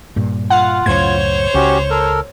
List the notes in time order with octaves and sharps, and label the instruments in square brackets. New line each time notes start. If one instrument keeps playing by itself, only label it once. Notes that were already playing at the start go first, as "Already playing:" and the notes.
[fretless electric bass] G2 A#2
[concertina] F4 [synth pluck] F5 F#5
[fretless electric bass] C#2 F#2 A2 [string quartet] C5 C#5 [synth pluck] G#6
[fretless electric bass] C#2 [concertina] C#4 F#4 G4
[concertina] A4 A#4